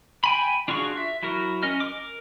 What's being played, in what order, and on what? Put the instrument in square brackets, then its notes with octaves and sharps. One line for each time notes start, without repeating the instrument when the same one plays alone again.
[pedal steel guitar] G5 G#5 B5
D4 F4 F#4 G#4 C#6
E5
F#3 E4 F#4 A#4
C#4 D#5 F6
A#4 D6